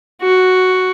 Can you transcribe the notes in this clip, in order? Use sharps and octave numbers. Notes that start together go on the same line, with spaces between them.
F#4